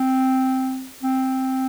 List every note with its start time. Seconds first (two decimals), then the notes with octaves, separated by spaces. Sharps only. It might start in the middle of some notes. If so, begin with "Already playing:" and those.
Already playing: C4
1.02 C4